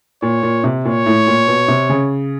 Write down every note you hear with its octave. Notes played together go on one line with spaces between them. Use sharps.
A#2 C#5
A#2
C3
A#2 C#5
A2
A#2
B2
C3
C#3